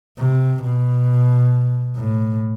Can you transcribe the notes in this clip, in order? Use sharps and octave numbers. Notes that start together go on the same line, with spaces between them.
C3
B2
A2